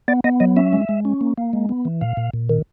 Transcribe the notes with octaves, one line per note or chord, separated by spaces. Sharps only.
B3 D5
B3 D#5
F#3 D#5
C#4 E5
G#3
G#3
C#4
A#3
A#3
G#3
B3
E3
A#2 F5
A#2
A#2
D#3